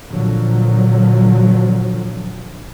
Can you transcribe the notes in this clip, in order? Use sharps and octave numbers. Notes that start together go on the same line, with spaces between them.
F2 A#2 D3 F3 F#3